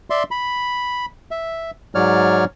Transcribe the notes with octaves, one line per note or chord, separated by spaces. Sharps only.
D5 E5 C6
B5
E5
G#2 F#3 C#5 D5 F6